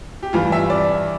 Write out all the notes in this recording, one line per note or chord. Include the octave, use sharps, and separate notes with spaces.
G4
G2 E3 G3 F4
E5
D5